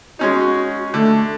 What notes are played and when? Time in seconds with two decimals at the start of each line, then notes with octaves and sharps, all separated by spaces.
0.19 G#3 C#4 D#4 F#4
0.94 D3 A3